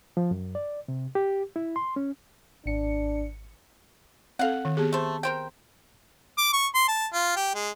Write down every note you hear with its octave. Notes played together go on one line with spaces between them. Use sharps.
F3
F#2
D5
C3
G4
E4
C6
C#4
G#1 D4 C#7
C4 A4 F5 F#5
D#3
B3 G4 G#4
A3 C5
A#4 C5 G5
D6
C#6
C6
A5
F4
G4
G#3